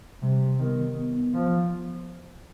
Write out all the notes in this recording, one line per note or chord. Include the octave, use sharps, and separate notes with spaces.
C3 G3
D#3 B3
B3
F3